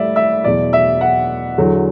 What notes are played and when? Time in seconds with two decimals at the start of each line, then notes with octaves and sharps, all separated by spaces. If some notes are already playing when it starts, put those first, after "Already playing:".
Already playing: A2 G3 D5 E5
0.16 E5
0.44 E2 B2 F#3 D5
0.73 E5
1.01 F#5
1.58 E2 D3 F#3